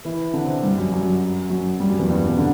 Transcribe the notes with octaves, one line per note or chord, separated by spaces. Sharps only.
E3 E4
D3 D4
C3 C4
G2 G3
F#2 F#3
F#2 F#3
F#2 F#3
G2 G3
F#2 F#3
E2 E3
G2 G3
B2 B3
D3